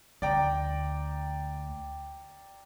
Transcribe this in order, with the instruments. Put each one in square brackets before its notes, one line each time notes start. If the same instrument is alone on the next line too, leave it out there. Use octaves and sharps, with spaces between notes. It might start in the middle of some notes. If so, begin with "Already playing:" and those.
[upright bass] D2 [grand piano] D5 G5 A#5